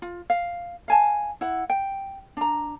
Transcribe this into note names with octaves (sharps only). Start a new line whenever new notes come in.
F4
F5
F5 G#5 A5
E4 F#5
G5
D4 A#5